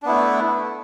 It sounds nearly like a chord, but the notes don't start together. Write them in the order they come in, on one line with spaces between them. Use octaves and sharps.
D4 B3 E4 A3